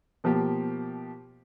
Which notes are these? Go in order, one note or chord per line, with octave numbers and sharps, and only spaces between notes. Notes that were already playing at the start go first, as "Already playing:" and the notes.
B2 F3 A#3 G4